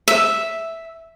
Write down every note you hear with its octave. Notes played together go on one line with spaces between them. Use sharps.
E5